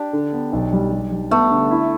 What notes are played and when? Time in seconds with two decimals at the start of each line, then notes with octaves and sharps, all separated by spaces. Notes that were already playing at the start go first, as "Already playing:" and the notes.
Already playing: D4 G4
0.13 D3
0.33 B3
0.53 B1
0.73 G3
0.92 G3
1.11 G3
1.31 A3 B3
1.50 D3
1.71 E4